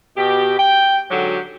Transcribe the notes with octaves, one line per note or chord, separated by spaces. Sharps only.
B2 G4
G5
G#2 D3 F#3 F#4 G4